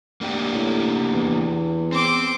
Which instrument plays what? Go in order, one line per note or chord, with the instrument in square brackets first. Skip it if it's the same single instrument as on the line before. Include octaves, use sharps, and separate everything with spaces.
[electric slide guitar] A#3 D4 G4
[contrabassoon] A2
E2
[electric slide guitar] C4 [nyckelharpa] C6 D6